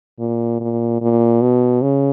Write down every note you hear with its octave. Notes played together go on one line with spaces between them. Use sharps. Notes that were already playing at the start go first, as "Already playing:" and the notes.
A#2
A#2
A#2
B2
C#3